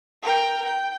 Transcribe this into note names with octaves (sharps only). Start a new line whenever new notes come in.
A#4 G5
G5